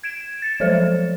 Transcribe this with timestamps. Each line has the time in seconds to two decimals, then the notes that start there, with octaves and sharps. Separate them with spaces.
0.03 G#6 D7 E7
0.42 A6 C#7 E7
0.60 F3 F#3 G#3 A4 C5 C#5